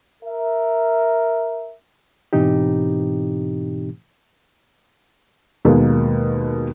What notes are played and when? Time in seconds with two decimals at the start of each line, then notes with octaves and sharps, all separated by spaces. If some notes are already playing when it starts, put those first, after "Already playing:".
0.22 A#4 E5
2.33 G#2 B2 E3 C4 D#4 G4
5.65 D#2 B2 G#3 A#3